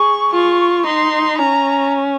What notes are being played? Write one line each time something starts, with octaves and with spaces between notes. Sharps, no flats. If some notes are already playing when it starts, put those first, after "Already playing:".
Already playing: G#4 C#6
F4 C#6
D#4 C6
C#4 A#5